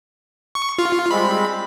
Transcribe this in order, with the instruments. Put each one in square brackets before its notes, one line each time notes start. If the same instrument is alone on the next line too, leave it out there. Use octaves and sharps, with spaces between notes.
[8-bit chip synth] C#6
F4
[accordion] G3 G#3 C4 [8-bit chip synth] B5